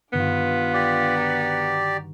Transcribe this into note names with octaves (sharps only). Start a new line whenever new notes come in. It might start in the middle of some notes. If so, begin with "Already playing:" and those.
G2 D3 D#3 B3 D4 F4
G4 D5
F#4 A#5